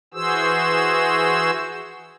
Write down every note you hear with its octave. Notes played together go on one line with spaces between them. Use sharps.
E3 F#4 G#4 C5 E6